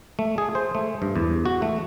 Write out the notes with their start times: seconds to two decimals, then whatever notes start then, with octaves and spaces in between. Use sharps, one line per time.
0.19 A3
0.38 G#4
0.55 C5
0.75 A3
1.02 G2
1.16 E2
1.45 F#4
1.62 A3